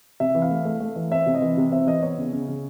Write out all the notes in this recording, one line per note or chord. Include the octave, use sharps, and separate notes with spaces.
C3 E5
E3
F5
A3
A3
A3
E3
C4 E5
C3
D#5
E3
C3
C4 E5
E3 D#5
B3 C#5
C#3
C#3
C#3